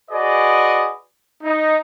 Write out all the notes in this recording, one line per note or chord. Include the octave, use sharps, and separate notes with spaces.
F#4 G#4 B4 D5 D#5
D#4